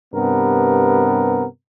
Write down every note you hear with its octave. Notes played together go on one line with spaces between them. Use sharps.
G2 C3 B3 A#4